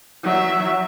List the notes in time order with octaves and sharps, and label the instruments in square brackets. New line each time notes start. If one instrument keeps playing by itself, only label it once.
[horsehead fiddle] F#3 E5